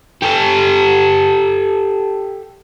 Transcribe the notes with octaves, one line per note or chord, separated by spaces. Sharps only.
G4 A4